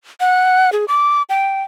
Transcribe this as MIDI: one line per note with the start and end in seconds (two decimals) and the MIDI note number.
0.20 0.70 78
0.73 0.85 68
0.88 1.22 86
1.30 1.63 79